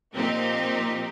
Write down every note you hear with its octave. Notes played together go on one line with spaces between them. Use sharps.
A#2 F3 C4 D#4 G4